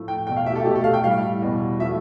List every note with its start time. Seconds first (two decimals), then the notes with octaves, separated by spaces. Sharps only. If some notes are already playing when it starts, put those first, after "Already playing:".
Already playing: A2 F3 A3
0.08 G5
0.27 E2 B2 A3 G5
0.36 F5
0.46 E5
0.52 G4
0.56 A4
0.65 B2 A3 G4
0.76 A4
0.84 F5
0.94 G5
1.03 A2 E3 G3 F5
1.42 E2 B2 G3
1.80 F3 A3 E5